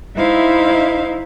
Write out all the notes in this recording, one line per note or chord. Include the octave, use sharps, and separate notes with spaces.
D#4 E4 C5 E5 F5